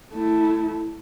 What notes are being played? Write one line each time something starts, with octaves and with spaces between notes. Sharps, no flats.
A3 E4